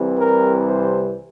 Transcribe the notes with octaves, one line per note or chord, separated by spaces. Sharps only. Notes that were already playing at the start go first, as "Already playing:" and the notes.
Already playing: C2 C3 E3 G3
A#4
C5